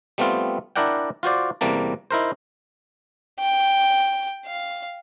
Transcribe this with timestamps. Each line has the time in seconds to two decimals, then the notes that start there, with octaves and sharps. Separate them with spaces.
0.18 G3 A3 B3 C4 F4
0.76 D4 E4 A#4 D5 F#5 G5
1.23 F4 F#4 C5 D5
1.61 E2 C3 G3 A#3 A5
2.11 D#4 E4 A#4 C5
3.40 G5
4.46 F5